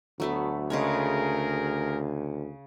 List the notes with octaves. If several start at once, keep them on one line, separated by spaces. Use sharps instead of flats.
D2 F#3 A3 B3
C#3 G#3 A3 G#4 A#4 C#5